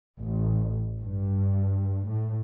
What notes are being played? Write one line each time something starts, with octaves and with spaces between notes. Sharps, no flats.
A1
G2
A2